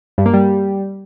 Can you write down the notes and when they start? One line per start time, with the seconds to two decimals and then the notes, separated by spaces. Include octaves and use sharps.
0.18 G2
0.26 A#3
0.33 G3